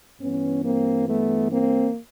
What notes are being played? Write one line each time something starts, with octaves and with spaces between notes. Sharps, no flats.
G2 E3 B3 C#4
A#3 C4
A3 B3
A#3 C4